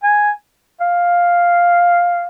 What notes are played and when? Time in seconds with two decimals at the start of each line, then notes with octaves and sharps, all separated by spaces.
0.03 G#5
0.80 F5